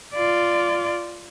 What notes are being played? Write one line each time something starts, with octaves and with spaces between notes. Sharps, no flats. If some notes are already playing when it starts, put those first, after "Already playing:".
F4 D5